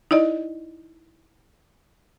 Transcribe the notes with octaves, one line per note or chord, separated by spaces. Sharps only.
D#4 E4 D5 D#5